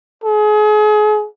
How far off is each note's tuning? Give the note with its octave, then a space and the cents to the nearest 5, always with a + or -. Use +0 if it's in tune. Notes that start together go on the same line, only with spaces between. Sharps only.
G#4 +35